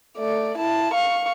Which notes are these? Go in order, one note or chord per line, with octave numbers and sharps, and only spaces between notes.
A3 D5
E4 A5
F5 C#6